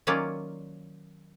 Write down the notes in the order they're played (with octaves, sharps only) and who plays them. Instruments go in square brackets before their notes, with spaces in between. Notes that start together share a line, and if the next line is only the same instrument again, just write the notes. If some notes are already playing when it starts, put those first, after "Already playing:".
[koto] D#3 F#3 A#3 C#4 F4 D5